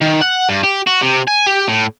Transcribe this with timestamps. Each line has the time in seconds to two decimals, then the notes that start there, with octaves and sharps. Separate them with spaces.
0.02 D#3
0.22 F#5
0.49 G2
0.64 G4
0.87 F#4
1.02 C3
1.28 G#5
1.47 G4
1.68 A2